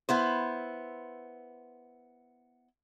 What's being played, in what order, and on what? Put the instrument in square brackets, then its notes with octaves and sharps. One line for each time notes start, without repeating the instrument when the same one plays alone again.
[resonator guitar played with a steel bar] B3 E4 C5